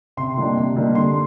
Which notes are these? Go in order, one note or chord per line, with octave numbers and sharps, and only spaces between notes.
C3 C6
D#3 G3 A#3 D4
C3
D#3 G3 A#3 D4
D3 C6